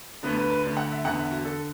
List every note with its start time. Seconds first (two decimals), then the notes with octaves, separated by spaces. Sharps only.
0.23 D2 D3 B3
0.38 B4
0.50 B4
0.63 D2 D3
0.77 F#5
0.91 E5
1.04 E2 D3 F#5
1.18 E5
1.31 F#4
1.44 D3 A4